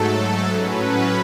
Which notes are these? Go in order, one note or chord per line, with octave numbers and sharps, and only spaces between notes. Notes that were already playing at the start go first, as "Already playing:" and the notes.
Already playing: G#2 F#3 A3 A4
A2 F#3 C#4 B4